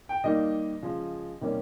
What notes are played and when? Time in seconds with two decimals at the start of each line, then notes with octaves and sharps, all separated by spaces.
0.09 G5
0.24 D#3 G3 A#3 D#4 D#5
0.82 C#3 F3 G#3
1.41 C3 D#3 G3 A#3 C#4